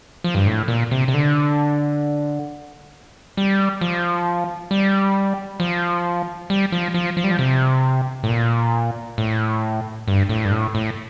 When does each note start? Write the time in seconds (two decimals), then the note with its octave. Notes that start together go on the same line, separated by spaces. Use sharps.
0.24 F3
0.35 G2
0.47 A2
0.68 A#2
0.91 C3
1.08 C3
1.14 D3
3.37 G3
3.81 F3
4.71 G3
5.60 F3
6.50 G3
6.72 F3
6.94 F3
7.17 F3
7.24 G3
7.31 F3
7.39 C3
8.23 A2
8.28 A#2
9.18 A2
10.08 G2
10.29 A2
10.45 G2
10.52 A2
10.75 A2